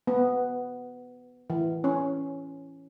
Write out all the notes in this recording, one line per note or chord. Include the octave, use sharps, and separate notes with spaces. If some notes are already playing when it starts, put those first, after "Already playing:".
B3
E3
C#4